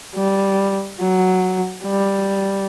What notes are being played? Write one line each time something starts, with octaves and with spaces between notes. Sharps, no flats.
G3
F#3
G3